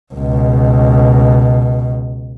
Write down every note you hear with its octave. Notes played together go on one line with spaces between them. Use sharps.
C#2 B2